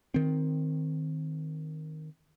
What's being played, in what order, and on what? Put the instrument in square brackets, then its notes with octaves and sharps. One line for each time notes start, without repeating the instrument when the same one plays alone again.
[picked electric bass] D#3 C4